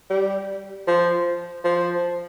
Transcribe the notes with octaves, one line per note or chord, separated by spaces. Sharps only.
G3
F3
F3